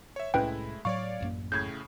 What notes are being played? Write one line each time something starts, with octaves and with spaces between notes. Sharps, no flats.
C#5 E5
C2 A2 G#3 A3 C#4 E4 B4 G5
A2 F#3 C#5 D5 F5 C#6
A1 F#2 A#3
A2 C#3 G6 G#6